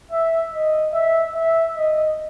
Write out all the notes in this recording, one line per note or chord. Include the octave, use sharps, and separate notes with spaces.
E5
D#5
E5
E5
D#5